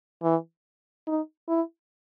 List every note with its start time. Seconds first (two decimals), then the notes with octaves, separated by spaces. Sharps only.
0.23 E3
1.07 D#4
1.48 E4